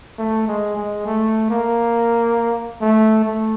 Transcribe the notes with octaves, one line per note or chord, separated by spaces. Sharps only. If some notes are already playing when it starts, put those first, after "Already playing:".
A3
G#3
G#3
A3
A#3
A3
A3